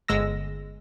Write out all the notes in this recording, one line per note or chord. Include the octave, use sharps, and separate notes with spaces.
G1 G#3 E6 A#6